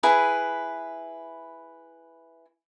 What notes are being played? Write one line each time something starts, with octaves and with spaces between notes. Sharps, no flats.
E4 G#4 B4